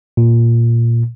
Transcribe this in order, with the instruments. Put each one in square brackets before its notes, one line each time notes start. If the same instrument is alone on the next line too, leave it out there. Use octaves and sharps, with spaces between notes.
[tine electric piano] A#2